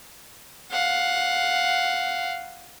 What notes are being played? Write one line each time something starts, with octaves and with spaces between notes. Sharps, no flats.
F5 F#5